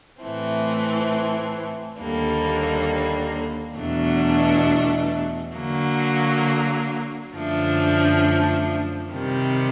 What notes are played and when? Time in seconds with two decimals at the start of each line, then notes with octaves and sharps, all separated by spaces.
0.21 A2 E3 A3 C4
1.99 D#2 D3 G3 A#3
3.77 E2 B2 F#3 A3 D4
5.56 D3 F#3 A#3
7.35 F#2 D3 F3 A3 D4
9.12 C3 D#3 G3